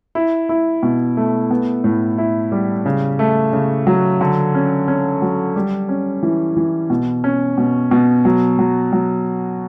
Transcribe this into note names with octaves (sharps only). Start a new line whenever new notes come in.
E4
E4
B2
A3
B3
A2
E4
G3
C#3
A3
C#3
F#3
D3
C#4
C#4
F#3
G3
C#4
E3
E3
B2
C#4
B2
B2
F#3
F#3
F#3